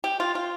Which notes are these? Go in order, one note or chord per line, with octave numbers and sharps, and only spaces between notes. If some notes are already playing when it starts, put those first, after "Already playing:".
G4
F4
F4